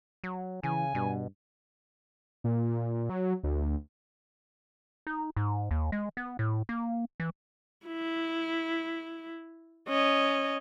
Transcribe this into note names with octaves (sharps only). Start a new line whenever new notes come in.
F#3
C#3 E3 G#5
G2 B2
A#2
F#3
D2
D#4
G#2
D#2
G#3
B3
A2
A#3
E3
E4
C#4 D#5